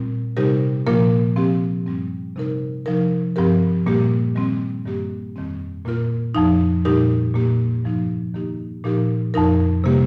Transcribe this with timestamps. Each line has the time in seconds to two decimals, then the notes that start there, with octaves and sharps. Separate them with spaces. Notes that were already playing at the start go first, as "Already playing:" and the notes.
Already playing: A#2 G3 C4 F4
0.37 C3 G3 D#4 G4 A#4
0.87 A#2 F3 A#3 F4 A#4
1.36 F3 C4 G4
1.86 G2 G3 C4
2.36 C3 G3 D#4 A#4
2.86 C3 F3 D#4 A#4
3.36 G2 F3 C4 G4 A#4
3.86 A#2 G3 A#3 G4
4.35 D#3 G3 C4
4.85 G2 D#3 G3 A#3 G4
5.36 F2 D#3 G3 C4
5.85 A#2 A#3 F4 A#4
6.35 F2 F3 D#4
6.85 A#2 G3 D#4 G4 A#4
7.34 A#2 A#3 G4
7.84 G2 F3 D#4
8.34 D#3 A#3 D#4 G4
8.84 A#2 F3 D#4 G4 A#4
9.34 F2 F3 D#4 A#4
9.84 C3 G3 A#3 G4